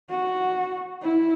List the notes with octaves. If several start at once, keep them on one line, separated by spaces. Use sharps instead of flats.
F#4
E4